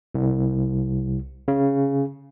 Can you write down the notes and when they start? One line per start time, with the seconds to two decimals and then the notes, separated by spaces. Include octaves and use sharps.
0.15 C2
1.48 C#3